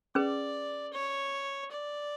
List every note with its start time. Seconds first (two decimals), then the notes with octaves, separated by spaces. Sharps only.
0.15 C#4 G#4 B4 D5
0.93 C#5
1.71 D5